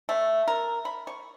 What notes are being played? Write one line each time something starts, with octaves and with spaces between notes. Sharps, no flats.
A3
A#4
B5
C#6